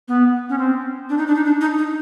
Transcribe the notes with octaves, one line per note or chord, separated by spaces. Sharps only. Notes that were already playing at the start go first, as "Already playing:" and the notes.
B3
C#4
C4
D4
D#4
D4
D#4
D4
D#4
D#4